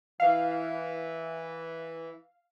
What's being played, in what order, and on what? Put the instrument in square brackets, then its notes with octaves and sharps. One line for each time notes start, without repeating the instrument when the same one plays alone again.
[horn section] E3 [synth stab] F5